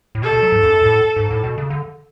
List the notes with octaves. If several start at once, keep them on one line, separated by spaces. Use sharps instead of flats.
A2
B2 A4
B2
F#3
G#2
F#2
A2
G#2
A2
B2
C#3
D3